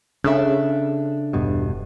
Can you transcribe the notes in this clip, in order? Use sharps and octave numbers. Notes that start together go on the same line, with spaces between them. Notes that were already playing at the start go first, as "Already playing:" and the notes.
C#3 D4 A4 E5
E1 G2 B2